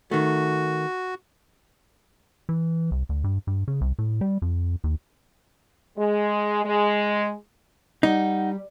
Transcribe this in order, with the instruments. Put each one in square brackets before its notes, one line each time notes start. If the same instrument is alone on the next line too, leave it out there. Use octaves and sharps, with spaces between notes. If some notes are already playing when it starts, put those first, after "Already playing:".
[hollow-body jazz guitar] D#3 A3 [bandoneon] F#4
[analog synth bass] E3
C2
D2
G2
G2
C#3
C2
A2
G3
F2
D#2
[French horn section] G#3
G#3
[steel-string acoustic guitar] G3 [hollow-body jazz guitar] D#4 [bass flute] F#5